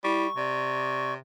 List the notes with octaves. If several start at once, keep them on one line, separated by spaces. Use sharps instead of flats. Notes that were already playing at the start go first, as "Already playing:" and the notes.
G3 E4 C#6
C3 D5